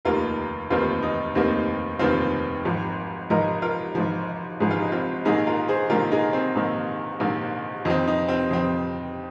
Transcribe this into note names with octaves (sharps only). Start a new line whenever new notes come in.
F1 D#2 D#3 A#3 F4 A#4
F1 D#2 D#3 A#3 C4 F4
D#4
F1 D#2 D#3 A#3 C4
F1 D#2 D#3 A#3 C4 F4
G#1 G#2 F3
G#1 G#2 F3 A#4 D#5
F4 A#4
G#1 G#2 F3
G#1 G#2 F3 G#4
F4
D#4
C4 F4
A#1 G#2 D#3 A#3 D#4 G#4
F4 A#4
G#4 C5
A#1 G#2 D#3 A#3 F4 A#4
D#4 G#4
C4
A#1 G#2 D#3 A#3
A#1 G#2 D#3 A#3
F2 F3 C4 D#4
D#4
C4 F4
F2 F3 C4